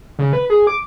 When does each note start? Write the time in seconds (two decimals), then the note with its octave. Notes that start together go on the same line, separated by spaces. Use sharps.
0.19 C#3
0.33 B4
0.50 G#4
0.67 D6